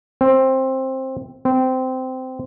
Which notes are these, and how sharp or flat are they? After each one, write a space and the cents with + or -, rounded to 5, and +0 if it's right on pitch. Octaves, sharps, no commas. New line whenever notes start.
C4 +15
C4 -15